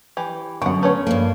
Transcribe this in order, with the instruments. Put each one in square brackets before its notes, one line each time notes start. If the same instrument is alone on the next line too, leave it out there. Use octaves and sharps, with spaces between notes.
[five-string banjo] E3 G4
[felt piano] F#2 C#6 [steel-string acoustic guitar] D3 [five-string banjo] F#5 G5
[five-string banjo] A3 C#4 C#5 [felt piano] B4
[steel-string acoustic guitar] G2 A#3